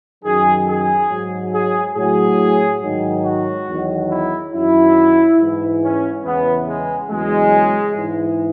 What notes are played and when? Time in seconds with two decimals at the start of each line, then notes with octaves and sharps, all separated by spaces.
0.24 F#2 D#3 F#3 G#4
0.67 G#4
1.11 G#2 F#3
1.54 G#4
1.96 A2 F#3 G#4
2.81 G#2 D#3 F#3
3.24 F#4
3.68 E2 D#3 F#3
4.11 E4
4.53 F#2 D#3 F#3 E4
5.40 G#2 E3
5.82 C#4
6.24 E2 C#3 E3 B3
6.67 G#3
7.10 E2 C#3 F#3 G#3
7.96 G#2 E3